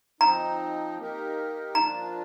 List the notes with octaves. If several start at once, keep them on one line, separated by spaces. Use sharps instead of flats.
F3 C4 D#4 A#5
A#3 D#4 G4 A#4
F3 A#3 D4 F4 A#5